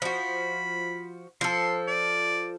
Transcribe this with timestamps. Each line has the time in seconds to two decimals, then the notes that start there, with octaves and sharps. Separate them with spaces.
0.02 F3 F#4 B5
1.41 F3 A4 C6
1.88 D5